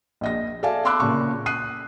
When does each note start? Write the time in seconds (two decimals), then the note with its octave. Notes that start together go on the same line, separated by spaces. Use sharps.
0.21 A#1 D#5 A#6
0.63 A4 D5 E5 F5 G#5 A5
0.85 A5 B5 C6 D6 E6 F#6
1.00 A#2 C#3 C#6
1.46 D#6 F#6 C7 D#7